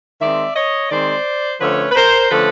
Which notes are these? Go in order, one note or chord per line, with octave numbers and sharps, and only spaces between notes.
D#3 G#3 C4 D5 E5
C#5 D#5
D#3 G#3 C4 C5 D5
D3 F3 A3 C#4 B4 C#5
B4
A#4 C5
D3 F3 A3 C#4 A4 B4